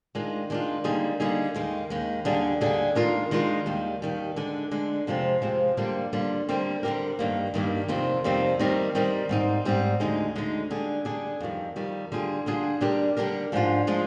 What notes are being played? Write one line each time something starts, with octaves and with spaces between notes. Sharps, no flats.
D#3 G#3 D4 F4
D#3 G#3 D4 F4
D3 G3 A#3 D#4 G#4
D3 G3 A#3 D#4 G#4
D#2 D#3 G#3
D#2 D#3 G#3
D#2 D3 G3 D4 G#4
D#2 D3 G3 D4 G#4
D#3 G#3 D4 F4 A#4
D#3 G#3 D4 F4 A#4
D#2 D#3 G3
D#2 D#3 G3
D3 G#3 D4
D3 G#3 D4
F2 C3 F3 G#3 C4
F2 C3 F3 G#3 C4
D3 G3 A#3 D4 F4
D3 G3 A#3 D4 F4
D3 G3 C4 G4 A#4
D3 G3 C4 G4 A#4
G2 D#3 G3 A#3
G2 D#3 G3 A#3
F2 C3 D#3 G3 C4
F2 C3 D#3 G3 C4
D#3 G3 C4 D#4 A#4
D#3 G3 C4 D#4 A#4
G#2 G3 C4 D#4
G#2 G3 C4 D#4
D2 D3 G#3 D#4
D2 D3 G#3 D#4
D3 G3 D4 G#4
D3 G3 D4 G#4
F2 D#3 G3
F2 D#3 G3
D3 G3 D4 F4 G#4
D3 G3 D4 F4 G#4
D3 G3 D4 G4 A#4
D3 G3 D4 G4 A#4
G#2 F3 G#3 D4 F4
F3 G#3 D4 F4